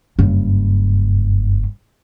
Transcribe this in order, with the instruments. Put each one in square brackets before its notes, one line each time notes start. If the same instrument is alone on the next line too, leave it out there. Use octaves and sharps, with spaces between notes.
[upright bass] F#1 G2